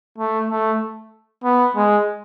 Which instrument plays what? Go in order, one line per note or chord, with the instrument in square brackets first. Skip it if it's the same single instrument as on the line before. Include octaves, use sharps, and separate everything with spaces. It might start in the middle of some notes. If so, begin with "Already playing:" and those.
[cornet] A3
A3
B3
G#3